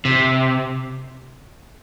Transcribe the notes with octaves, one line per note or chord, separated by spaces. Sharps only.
C3